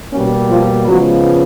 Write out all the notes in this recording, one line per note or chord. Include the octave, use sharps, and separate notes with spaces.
B2 G3 A#3 C#4
F3 F4
C#3 F3 F#3 G#3 B3 F#4